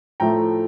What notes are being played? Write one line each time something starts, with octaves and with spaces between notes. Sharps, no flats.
A2 F3 A3 G5 A#5